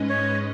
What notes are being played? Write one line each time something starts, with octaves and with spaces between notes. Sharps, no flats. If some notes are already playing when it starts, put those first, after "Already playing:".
Already playing: G#2 G#3 C#4 B4 D#5
C#5